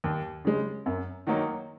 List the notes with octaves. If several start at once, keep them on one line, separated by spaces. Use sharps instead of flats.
D#2
C#3 G#3
F#2
D#3 F#3 A#3 D#4